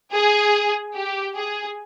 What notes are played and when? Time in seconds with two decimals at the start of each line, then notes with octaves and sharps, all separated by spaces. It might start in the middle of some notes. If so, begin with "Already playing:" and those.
0.13 G#4
0.95 G4
1.36 G#4